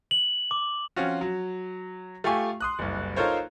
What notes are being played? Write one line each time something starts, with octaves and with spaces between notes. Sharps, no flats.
F#7
D6
F3 C4 C#4 F4 F#4
F#3
A3 F4 G4 F5 G#5 C#6
C6 D#6 F#6
F#1 C2
D#4 F4 A4 A#4 C5 C#5